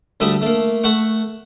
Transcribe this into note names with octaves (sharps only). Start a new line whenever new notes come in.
D2 G3 A4 E5 D#6
A3 A#3
A3 F#5 C#6